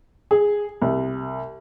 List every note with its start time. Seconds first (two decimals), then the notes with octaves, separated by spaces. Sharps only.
0.31 G#4
0.82 C2